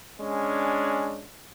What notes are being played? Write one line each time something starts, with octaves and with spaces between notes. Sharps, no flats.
G#3 C#4 D4